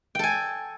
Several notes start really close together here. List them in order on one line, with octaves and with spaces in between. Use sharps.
G5 A4 G#5